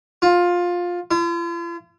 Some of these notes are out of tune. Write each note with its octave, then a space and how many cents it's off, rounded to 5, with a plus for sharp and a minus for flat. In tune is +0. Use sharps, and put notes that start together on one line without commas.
F4 +15
F4 -45